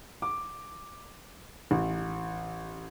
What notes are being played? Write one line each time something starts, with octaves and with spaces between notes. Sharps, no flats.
D6
A1